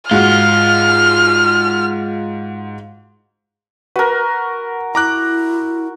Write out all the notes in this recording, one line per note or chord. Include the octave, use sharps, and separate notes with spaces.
G#2 F4 F#4 F6
F#4 A#4 B4
E4 A#5 D6 F#6